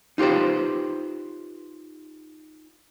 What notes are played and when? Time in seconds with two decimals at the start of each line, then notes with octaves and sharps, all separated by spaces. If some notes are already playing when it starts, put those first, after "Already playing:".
0.18 D#4 F4 G4 B4 C5